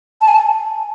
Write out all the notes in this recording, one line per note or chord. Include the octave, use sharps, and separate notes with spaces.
A5
G#5
A5